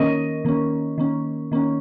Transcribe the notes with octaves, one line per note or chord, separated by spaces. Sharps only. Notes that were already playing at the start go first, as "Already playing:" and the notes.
Already playing: D#3 A#3 C#4 A#4 D#5
D#3 A#3 C#4
D#3 A#3 C#4
D#3 A#3 C#4